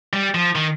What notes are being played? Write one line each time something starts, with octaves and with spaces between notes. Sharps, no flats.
G3
F3
D#3